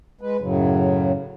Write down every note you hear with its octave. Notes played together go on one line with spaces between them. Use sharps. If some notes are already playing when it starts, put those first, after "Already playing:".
G#3 B4
F#2 A2 C#3 F#3